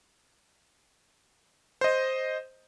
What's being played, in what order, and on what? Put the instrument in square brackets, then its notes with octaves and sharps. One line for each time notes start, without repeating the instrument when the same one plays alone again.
[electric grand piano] C5 D#5